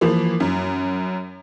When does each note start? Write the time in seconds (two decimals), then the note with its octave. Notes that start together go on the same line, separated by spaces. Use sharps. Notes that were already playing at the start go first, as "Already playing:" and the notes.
0.01 E3 F3 A#3
0.40 F#2